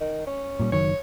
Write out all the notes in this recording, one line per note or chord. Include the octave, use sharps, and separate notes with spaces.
D#3
C#4
A#2 G3
F#1 D#3 F#3 C#5